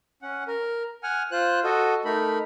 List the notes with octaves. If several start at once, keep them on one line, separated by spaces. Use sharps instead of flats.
C#4 F#5
A#4
F#5 G#5 F6
F4 C5 F#6
F#4 A4 D#5
A3 D#4 A#4 B5